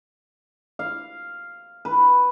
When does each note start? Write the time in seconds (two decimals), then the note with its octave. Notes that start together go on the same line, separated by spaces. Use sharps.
0.79 F5
1.85 B4